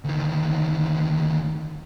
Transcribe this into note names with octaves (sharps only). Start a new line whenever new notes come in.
D2 D#3